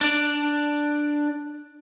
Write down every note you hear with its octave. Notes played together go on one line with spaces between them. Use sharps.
D4 D5